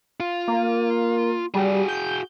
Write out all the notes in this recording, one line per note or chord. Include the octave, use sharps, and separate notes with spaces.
F4
A#3
G3 F#4 G#4
G6